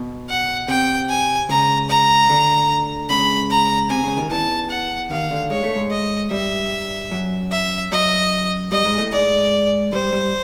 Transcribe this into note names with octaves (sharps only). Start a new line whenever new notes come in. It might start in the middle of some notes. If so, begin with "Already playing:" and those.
Already playing: B2
F#5
C3 G5
G#5
C#2 C#3 A#5
A#5
D2 D3
C#2 C#3 B5
A#5
C3 G#5
C#2 C#3
D#2 D#3
E2 E3 A5
F#5
D#2 D#3 F5
D2 D3
G#3 C#5
A3
G#2 G#3
D#5
G2 G3 E5
F#2 F#3
E5
F#2 F#3 D#5
G2 G3 D#5
G#2 G#3
A2 A3
G#2 G#3 D5
G2 G3 C5
G2 G3